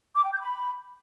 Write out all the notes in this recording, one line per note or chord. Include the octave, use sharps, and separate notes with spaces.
D6
G5
G6
B5